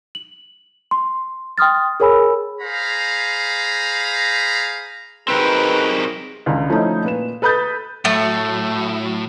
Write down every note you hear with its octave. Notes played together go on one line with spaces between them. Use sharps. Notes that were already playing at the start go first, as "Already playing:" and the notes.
F#7
C6
G5 C6 D#6 F6 A6
G#4 A#4 C#5 G#5 B5 E6
G#4 C5 F5 A#5 B5
F#3 C4 D#4 G4 G#4 A#4 B4
C#2 D3 A#5
F3 A3 C#4 D#4 E4
A#2 B4 E7
A4 B4 B5 D#6 G6 A6
A2 F#3 A3